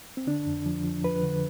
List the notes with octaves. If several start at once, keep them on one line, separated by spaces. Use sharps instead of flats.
C4
D3 D4
F2
F3
F3
F3 B4
D3